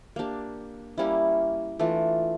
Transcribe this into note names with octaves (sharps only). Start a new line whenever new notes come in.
A#3 D4 G4
G3 A#3 C#4 E4
E3 A3 D4 F4